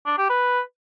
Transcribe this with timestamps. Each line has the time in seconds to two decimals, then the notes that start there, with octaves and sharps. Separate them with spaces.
0.06 D4
0.18 G4
0.30 B4